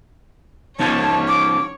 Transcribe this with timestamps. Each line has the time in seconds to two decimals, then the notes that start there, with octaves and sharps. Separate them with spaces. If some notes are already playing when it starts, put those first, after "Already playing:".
0.79 F3 C#4 D#4 C#5 A5
1.28 D6